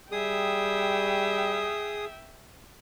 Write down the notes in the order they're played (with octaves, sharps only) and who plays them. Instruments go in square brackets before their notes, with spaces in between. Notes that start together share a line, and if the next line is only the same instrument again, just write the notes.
[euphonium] G3 [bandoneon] G#4 D#6 [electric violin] E5 G5